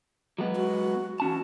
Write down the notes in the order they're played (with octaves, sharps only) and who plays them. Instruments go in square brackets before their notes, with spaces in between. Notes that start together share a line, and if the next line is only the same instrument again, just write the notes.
[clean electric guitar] F#3 G#3 B3
[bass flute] F#4
[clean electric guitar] E2 C#4 A5 [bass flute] F#4